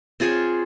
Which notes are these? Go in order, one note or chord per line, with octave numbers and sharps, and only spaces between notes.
C4 F4 G#4 C#5